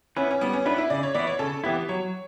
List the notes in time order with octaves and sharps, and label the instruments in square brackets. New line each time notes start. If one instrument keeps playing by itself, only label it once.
[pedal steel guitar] B3 E4 B4 [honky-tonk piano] C#4
[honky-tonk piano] C#4
[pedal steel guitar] G3 [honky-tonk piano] B3
[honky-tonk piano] C#4
[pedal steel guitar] B3 E4 B4 [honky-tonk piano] D4
[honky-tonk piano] E4
[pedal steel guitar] C#3 [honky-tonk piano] D5
[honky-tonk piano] C#5
[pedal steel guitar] E3 B3 E4 [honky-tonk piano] D5
[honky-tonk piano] C#5
[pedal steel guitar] C#3 [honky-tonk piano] A4
[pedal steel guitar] E3 B3 E4 [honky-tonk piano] G4
[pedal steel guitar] F#3 [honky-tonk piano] C#5